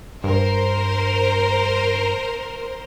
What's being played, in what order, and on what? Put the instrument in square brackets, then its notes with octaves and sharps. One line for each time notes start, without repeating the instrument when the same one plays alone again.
[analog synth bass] G2 [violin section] A#4 C5